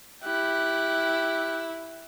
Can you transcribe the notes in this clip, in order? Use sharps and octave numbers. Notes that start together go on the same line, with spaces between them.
E4 G4 F#6